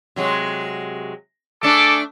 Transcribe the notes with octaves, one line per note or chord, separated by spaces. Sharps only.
C3 F#3 G#3
A3 D4 G#4 A4 D6